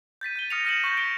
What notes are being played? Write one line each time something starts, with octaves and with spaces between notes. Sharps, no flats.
G6 A6 B6 D#7
G6 D#7 G7
D#6 F6 A#6 C#7 D#7 F7
D#6 F6 A#6 D#7 E7 F#7
C#6 G6 A#6
B6 D7 G7